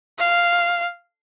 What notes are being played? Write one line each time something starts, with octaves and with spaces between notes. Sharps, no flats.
F5